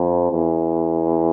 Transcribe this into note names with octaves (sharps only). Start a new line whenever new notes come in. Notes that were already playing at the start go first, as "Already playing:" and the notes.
Already playing: F2
E2